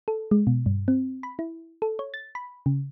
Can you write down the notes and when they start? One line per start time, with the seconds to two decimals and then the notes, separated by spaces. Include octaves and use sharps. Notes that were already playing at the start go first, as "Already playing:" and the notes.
0.08 A4
0.31 G#3
0.47 B2
0.66 G2
0.88 C4
1.23 B5
1.39 E4
1.82 A4
1.99 C#5
2.14 A6
2.35 B5
2.66 C#3